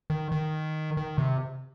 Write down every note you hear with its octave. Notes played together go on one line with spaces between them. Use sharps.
D#3
D#3
D#3
C3